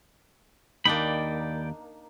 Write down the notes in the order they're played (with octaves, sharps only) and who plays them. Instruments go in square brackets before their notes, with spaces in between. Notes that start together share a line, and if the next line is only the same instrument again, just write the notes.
[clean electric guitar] D#2 [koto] A#3 D4 D#4 [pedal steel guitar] D5 G5 B5